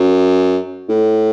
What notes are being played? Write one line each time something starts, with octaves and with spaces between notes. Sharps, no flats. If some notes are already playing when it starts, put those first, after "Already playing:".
Already playing: F#2
A2